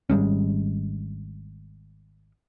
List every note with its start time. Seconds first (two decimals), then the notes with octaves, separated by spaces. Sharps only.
0.10 G#1 G3 G#3 C#4